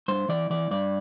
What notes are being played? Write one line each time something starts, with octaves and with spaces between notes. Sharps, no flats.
G2 C5
E3 D5
E3 D5
G2 D5